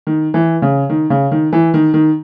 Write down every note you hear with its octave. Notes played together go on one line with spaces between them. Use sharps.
D#3
E3
C#3
D#3
C#3
D#3
E3
D#3
D#3